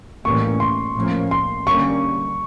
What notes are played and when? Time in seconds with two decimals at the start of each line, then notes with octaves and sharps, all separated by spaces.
0.25 A2 E3 G3 A#3 C#4 C#6
0.60 C6
0.95 A2 F3 A#3 C#4
1.31 C6
1.67 D3 G3 A#3 C#4 C#6